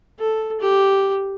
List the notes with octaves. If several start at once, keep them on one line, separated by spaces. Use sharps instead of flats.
A4
G4